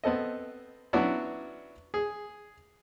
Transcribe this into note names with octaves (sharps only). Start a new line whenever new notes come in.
B3 C4 A4 D#5
F#3 B3 C#4 D4 E4 F#4
G#4